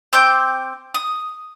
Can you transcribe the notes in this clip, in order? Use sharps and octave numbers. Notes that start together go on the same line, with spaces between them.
C4 C6 D6 G6
D#6